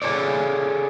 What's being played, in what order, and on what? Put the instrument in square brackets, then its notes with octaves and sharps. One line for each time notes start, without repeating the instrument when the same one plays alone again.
[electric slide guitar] G#4 A4 C#5 D5